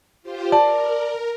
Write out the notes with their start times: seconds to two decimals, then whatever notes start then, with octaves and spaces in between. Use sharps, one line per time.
0.22 F4 G4 C5
0.52 A#4 D5 A5